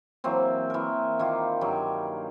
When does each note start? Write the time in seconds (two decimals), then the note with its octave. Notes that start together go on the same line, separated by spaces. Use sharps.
0.24 E3 F#3 A#3 C4
0.70 E3 A#4
1.19 D#3 A#3 F4
1.61 G2 F#3 G3